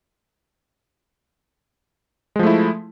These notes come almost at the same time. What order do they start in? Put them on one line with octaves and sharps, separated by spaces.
G#3 F3 A3 E4